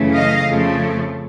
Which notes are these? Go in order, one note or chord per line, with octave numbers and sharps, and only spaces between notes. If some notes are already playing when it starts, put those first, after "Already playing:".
Already playing: F#2 C#3 E3 A3
D#5 F5
F2 C#3 F3 A3